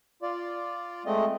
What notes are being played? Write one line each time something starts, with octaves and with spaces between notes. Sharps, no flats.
F4 D5
G#3 A3 C4 D#5